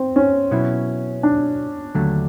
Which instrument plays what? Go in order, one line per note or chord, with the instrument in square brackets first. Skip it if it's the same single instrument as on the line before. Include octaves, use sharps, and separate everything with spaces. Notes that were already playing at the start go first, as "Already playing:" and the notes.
Already playing: [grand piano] C4
C#4
[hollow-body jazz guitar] B2 F#3 B3 E4
[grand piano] D4
[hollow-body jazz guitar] D#2 D3 F#3 A3